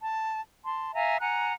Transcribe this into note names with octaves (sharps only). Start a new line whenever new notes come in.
A5
A5 C6
E5 F5 G#5 A#5
F#5 G#5 A#5 F#6